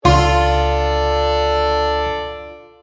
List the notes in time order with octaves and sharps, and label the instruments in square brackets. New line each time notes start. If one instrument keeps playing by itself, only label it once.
[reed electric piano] C#2 C6 [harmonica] D4 A4 D5 [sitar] F4